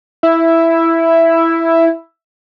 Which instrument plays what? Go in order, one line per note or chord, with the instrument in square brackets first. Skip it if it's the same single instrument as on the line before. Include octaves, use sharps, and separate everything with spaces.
[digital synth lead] E4 [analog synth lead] E5